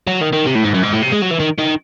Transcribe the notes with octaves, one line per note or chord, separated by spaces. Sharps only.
F#3
D#3
D#3
C3
A2
G#2
F#2
G#2
A2
C3
G#3
F#3
E3
D#3
D#3